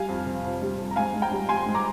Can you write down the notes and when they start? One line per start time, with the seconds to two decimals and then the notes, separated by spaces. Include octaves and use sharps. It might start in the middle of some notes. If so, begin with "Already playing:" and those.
Already playing: G3 F5 G#5
0.09 F2
0.26 C3
0.44 F2
0.62 G3
0.78 F2
0.91 A#5
0.96 G#2 F5 G#5
1.14 G#2
1.22 G5 A#5
1.32 G3
1.49 G3 G#5 C6
1.66 G#2
1.75 A#5 D6